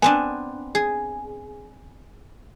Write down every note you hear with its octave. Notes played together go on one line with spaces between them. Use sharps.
B3 C4 D4 G#5
G#4